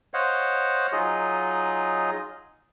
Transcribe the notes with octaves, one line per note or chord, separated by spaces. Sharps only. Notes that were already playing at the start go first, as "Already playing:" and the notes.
C5 C#5 D#5 F5 F#5
F#3 D#4 F4 G#4 D#5